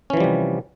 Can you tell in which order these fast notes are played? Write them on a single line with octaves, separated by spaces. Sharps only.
C#4 E3 F3 G3 C3